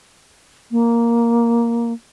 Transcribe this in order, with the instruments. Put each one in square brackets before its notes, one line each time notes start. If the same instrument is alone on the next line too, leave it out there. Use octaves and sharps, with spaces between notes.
[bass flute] A#3